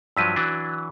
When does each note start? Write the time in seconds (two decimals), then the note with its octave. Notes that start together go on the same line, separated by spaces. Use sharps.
0.17 G2 F3 F#3 E6 B6 D#7
0.36 E3 F#3 D4